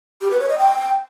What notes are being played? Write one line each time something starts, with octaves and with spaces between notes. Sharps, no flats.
G4
B4
C#5
D#5
G5